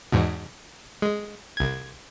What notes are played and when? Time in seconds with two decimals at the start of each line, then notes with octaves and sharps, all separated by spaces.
0.12 E2 G#2 B2
1.02 G#3
1.57 C2 G#6